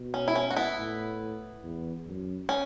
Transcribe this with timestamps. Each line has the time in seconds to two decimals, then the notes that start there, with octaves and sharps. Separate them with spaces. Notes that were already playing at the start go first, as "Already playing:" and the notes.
Already playing: B2
0.14 C#4
0.28 E4
0.36 C#4
0.51 F#4
0.56 B3 E4
0.78 A2
1.64 E2
2.06 F#2
2.49 C#4